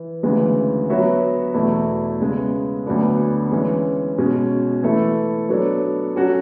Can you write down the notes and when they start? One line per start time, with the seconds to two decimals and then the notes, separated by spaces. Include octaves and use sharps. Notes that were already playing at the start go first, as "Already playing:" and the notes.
Already playing: E3
0.23 D2 C#3 E3 G#3
0.90 F#3 B3 F#4 C#5 E5
1.54 E2 B2 A3 E4
2.20 C#3 G#3 B3
2.86 D2 D3 F#3 B3 D4
3.52 E3 G#3 C#4
4.18 B2 G#3 C#4
4.83 E3 A3 E4 A4
5.49 F#3 B3 D4 A4 C#5
6.15 F#3 C#4 F#4 A4